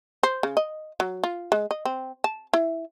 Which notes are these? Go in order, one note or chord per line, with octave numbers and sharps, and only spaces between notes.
C5
C#3
D#5
F#3
F4
G#3
D#5
C4
A5
E4